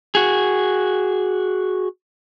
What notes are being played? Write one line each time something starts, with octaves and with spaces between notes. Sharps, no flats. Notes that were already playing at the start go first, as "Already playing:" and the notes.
F#4 G#4